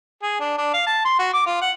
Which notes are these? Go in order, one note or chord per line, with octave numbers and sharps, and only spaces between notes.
G#4
D4
D4
F5
A5
C6
F#4
D6
F4
F#5